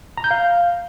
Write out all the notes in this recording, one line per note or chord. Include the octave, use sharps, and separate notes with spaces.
A#5
G6
F5